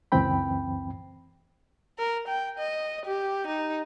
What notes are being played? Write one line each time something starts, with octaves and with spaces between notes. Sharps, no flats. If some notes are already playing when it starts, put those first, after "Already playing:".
C#2 F#2 E3 C4 G5 B5
A#4
G5
D#5
G4
D#4